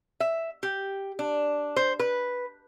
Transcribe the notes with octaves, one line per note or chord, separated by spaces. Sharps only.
E5
G4
D4
C5
B4